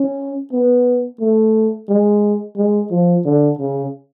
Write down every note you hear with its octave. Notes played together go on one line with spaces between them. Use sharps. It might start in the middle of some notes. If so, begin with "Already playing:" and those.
Already playing: C#4
B3
A3
G#3
G#3
F3
D3
C#3